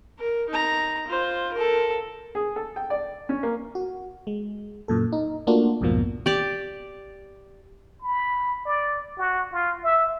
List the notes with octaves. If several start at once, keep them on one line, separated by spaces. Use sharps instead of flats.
A#4
D#4 A#5
F4 C5
A4 A#4
G#4
A4
G5
D5
C#4
A#3
F#4
G#3
F#2 A#2 A4
D#4
A3 A#3 D4 F4 F#4
B1 F2 G#2 B2 F3 A#3
G4 D5
B5
D5
F#4
F4
E5